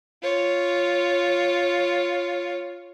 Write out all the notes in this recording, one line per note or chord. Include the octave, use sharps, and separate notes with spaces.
F4 C#5